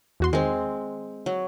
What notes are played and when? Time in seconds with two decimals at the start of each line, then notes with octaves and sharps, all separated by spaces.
0.20 E2 F#4 C6
0.33 D#3 G#3 C4
1.26 F#3